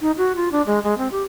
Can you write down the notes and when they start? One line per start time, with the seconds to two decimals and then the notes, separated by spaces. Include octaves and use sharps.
0.01 D#4
0.18 F#4
0.36 F4
0.52 D4
0.67 G#3
0.84 G#3
0.98 C4
1.12 G4